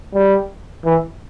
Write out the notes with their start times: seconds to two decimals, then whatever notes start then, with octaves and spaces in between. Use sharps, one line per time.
0.14 G3
0.85 E3